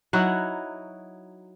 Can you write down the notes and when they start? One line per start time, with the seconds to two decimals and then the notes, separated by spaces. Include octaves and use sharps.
0.13 F#3 D#4 E4 F#4